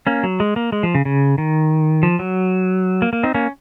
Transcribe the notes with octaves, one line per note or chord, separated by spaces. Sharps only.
A#3 C#4
F#3
G#3
A#3
G#3
F3
C#3
C#3
D#3
F3
F#3
A#3
A#3
C4 D#4
A#3 C#4